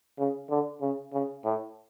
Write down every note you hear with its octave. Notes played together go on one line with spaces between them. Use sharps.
C#3
D3
C#3
C#3
A2